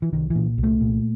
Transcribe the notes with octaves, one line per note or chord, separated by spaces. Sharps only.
E3
C2 D#3
E3
A#2
C2
A3
A#2